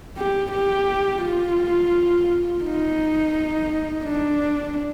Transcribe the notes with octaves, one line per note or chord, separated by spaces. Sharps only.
G4
G4
F4
D#4
D4